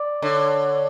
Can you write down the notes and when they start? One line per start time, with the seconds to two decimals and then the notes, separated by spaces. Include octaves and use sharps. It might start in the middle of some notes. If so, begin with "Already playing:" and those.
Already playing: D5
0.22 D3 C#5